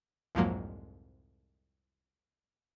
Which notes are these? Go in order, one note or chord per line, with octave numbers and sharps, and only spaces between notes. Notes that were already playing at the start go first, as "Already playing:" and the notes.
C2 F2 G#2 F3 F#3 A#3